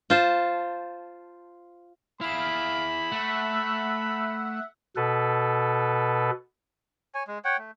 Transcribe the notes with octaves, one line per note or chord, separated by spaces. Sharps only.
F4 C5 A5
E4 G#4 F5 B5 D7
A3 E5 F#5
B2 A4 B4
C#5 G#5
G#3
C#5 F#5 G5
A3